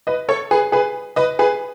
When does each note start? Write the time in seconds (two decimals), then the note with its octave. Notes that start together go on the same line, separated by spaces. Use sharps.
0.07 B4 D#5
0.29 A4 C#5
0.51 G#4 B4
0.72 G#4 B4
1.16 B4 D#5
1.39 G#4 B4